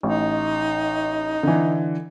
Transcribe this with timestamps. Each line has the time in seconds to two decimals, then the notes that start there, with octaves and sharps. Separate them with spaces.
0.03 A1 D#4
1.43 D3 E3